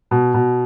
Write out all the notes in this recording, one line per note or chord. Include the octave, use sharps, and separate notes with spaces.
B2
B2